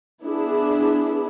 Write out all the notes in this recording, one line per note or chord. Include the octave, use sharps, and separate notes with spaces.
B3 D4 E4 G#4